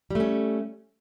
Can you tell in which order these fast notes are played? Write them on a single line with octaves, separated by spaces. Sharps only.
G3 A3 C#4